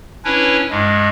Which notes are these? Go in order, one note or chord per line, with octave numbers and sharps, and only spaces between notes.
C#4 D4 E4 B4 C#5
G2 G#3